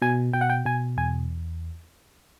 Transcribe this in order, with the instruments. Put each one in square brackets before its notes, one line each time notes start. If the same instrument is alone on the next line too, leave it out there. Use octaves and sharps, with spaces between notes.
[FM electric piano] B2 G#5
B2 G5
F#5
G5
B2 G#5
E2 G#5